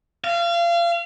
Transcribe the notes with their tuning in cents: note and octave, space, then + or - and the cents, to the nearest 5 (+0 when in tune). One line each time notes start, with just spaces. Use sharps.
F5 -30